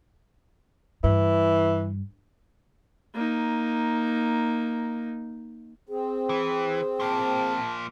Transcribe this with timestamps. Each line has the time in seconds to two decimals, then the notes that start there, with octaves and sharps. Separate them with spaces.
1.04 G2 E3
3.14 A#3 D#4
5.89 C4 G#4
6.29 E3
7.00 F3 A#3 A5